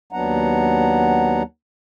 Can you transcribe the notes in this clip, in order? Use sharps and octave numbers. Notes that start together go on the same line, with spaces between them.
D#2 F#3 B3 D4 F#5 A#5